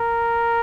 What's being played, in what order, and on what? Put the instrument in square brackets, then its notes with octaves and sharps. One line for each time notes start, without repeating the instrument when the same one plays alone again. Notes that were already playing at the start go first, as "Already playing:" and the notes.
Already playing: [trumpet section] A#4